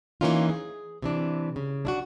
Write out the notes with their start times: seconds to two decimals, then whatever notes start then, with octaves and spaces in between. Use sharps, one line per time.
0.21 E3 F#3 A#3 C#4 D#4 F4
0.49 G#4
1.02 C3 E3 D4
1.56 C#3
1.85 D4 E4 F#4